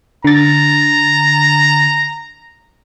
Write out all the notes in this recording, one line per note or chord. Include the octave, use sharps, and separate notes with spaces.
D3 A#5 A6